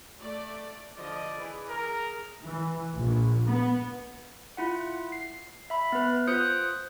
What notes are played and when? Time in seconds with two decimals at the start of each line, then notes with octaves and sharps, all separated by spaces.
0.20 A3 D5
0.96 D3 F3 D5 D#5
1.36 E3 G#4
1.69 G#4 A#4
2.43 E3
2.97 A#1
3.47 B3
4.57 E4 F4 F#5
5.12 C7
5.70 E5 B5
5.92 B3 B4
6.27 F4 C5 D#6 F#6 G6 C#7